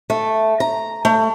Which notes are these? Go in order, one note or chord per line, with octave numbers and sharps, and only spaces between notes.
A3
A#5
A3